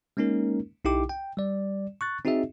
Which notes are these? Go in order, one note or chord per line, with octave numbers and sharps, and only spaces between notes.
G#3 A#3 C#4 D#4 A#4
B1 D#4 E4 G4 G5 D6
G5
G3 D5
C#6 F#6 A6
C4 D#4 F#4 G#4 D#5 E5